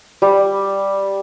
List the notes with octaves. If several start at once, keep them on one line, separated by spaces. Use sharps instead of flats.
G3